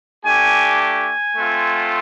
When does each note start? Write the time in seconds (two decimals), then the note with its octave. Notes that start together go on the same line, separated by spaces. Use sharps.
0.25 A3 D4 G4 G#5
0.80 G#5
1.36 A3 C4 F4